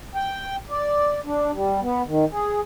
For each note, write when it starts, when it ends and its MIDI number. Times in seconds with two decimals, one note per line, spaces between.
0.15 0.56 79
0.70 1.20 74
1.25 1.51 62
1.53 1.80 55
1.82 2.02 59
2.07 2.25 51
2.31 2.60 68